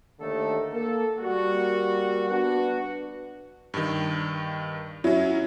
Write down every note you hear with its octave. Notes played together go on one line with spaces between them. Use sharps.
D#2 D3 A3 D#4 A4
A#3 A4
G3 A#3 F#4
B3 D4 F#4
G2 D#3
F#3 C#4 E4